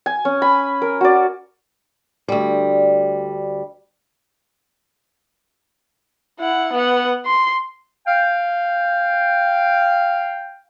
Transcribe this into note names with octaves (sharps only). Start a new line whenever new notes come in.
G#5
C#4
B5
A#4
F#4 D5
D2 G3
E4 F#5
B3 F#5
C6
F5 G5